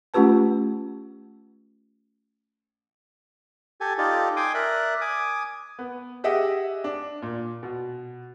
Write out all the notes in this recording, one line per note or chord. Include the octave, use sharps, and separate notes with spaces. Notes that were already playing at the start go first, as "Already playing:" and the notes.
A3 C#4 F4 G4 B4 A5
G4 A4 G#5
D#4 F4 G4 A4 D5
G5 G#5 C6 D6 D#6
A#4 D5 E5 F#6
G#5 D6 D#6
B3
G4 G#4 D#5 E5 F#5
D4
A#2
B2